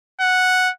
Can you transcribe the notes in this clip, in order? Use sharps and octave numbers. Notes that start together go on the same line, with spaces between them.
F#5